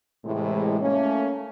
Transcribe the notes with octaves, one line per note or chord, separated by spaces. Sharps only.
A2 C3 E3 G#3
A3 A#3 C#4